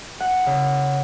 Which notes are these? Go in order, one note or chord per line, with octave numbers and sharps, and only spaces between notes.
F#5
C#3